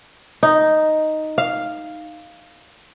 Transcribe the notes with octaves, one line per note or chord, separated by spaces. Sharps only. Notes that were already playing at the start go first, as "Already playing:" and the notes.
D#4
F5